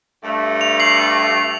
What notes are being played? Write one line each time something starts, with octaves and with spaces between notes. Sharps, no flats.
G2 A3
F7
C7 F#7